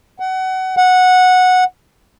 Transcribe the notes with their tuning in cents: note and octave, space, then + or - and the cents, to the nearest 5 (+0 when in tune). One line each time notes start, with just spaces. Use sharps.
F#5 +25
F#5 -10